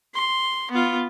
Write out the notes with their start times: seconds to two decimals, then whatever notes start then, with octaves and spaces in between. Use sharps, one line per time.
0.14 C6
0.71 B3 F4